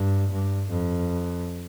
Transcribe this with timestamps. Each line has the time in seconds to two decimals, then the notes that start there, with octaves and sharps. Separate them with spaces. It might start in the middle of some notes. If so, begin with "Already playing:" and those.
Already playing: G2
0.32 G2
0.70 F2